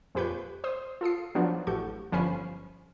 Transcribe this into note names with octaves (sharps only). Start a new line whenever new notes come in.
F2 A#2 G4 B4 C#6 G6
C5 C6 D#6
F4 A4 D#6 C7
F3 F#3 B3 D4
A1 F#4 G4 A4 C#6 G6
G1 F3 C#4 G#5 B5 C7